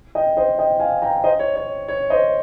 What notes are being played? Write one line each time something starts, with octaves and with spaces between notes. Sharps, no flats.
D#5 G5
C5 D#5
D#5 G5
F5 G#5
G5 A#5
C5 D#5
C#5
C#5
C#5
C5 D#5